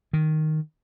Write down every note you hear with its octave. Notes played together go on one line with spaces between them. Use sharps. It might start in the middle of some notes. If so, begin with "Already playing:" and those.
D#3